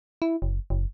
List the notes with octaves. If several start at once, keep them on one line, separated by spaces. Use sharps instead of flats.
E4
F#1
F#1